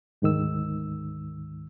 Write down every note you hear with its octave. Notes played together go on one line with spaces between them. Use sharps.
D2 G#2 D#3 E6